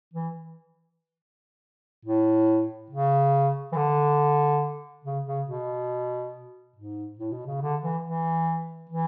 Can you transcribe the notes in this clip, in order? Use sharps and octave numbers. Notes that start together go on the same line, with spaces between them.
E3
A2
C#3
E3
D3
C#3
C#3
B2
G#2
A2
B2
C#3
D3
E3
E3
E3